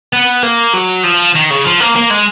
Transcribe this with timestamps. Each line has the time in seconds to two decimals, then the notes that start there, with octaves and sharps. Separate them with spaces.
0.13 B3
0.43 A#3
0.73 F#3
1.03 F3
1.35 D#3
1.50 C#3
1.65 F3
1.80 A#3
1.96 A#3
2.11 G#3